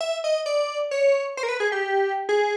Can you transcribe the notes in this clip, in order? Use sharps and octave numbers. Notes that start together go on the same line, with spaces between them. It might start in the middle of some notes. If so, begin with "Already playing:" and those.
E5
D#5
D5
C#5
C5
A#4
B4
G#4
G4
G#4